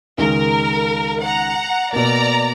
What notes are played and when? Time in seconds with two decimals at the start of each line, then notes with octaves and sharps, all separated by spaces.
0.18 C#2 D#3 G#3 A#4
1.22 F#5 A#5
1.93 B2 A#3 D5 A#5